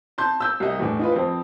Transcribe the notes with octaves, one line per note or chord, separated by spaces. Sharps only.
A5 C6 G6
E6 G6
C2 D#5 E5
E2 A2 D4
D#4 F4 B4
F2 C4